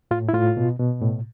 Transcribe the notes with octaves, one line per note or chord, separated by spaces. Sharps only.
A2 F4
E4
A2 F4
B2
B2
A2